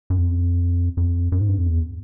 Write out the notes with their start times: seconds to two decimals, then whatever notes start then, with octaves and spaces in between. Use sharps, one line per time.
0.10 F#2
0.18 F2
0.97 F2
1.32 F#2
1.41 G#2
1.49 G2
1.58 F2
1.67 E2